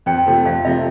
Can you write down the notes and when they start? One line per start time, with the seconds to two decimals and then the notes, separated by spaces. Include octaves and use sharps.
0.06 F2 G5
0.27 C3 F3 A3
0.45 F2 F5
0.65 C3 F3 A3 E5